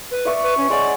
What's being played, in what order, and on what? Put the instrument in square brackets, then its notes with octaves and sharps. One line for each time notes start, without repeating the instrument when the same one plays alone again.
[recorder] B4
[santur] D5 E5 C#6
[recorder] B4
C#4
[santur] G#3 C#5 F#5 [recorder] D5